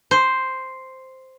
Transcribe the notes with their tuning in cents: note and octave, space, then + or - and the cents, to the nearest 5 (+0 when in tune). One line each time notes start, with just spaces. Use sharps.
C5 +0